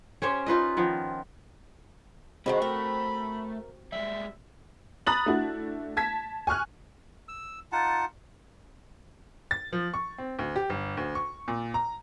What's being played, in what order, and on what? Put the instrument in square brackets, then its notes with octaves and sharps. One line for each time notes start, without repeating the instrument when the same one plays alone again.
[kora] C#4 G4 C5 C#5
D#4 F4 B4 D#5
D#3 F3 B3
[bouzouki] D#3 F3 G#3 [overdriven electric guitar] G3 C5 [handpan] C4 F#4 [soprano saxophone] B5
[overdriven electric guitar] A3 [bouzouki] A#4
[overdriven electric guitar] G3 G#3 [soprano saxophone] E5
[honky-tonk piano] A#5 B5 D#6 F#6 A6 F#7
A3 D4 E4 F#4
A5 G#6 B6
G#5 C#6 F6 F#6
[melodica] E6
D#4 F4 F#5 A5
[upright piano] A6
F3
C#6
C4
D2
G4
G1
D2
C#6
A#2
A#5